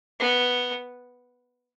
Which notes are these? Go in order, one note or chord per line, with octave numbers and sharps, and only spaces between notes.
B3